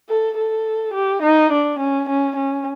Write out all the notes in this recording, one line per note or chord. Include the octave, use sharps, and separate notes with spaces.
A4
A4
G4
D#4
D4
C#4
C#4
C#4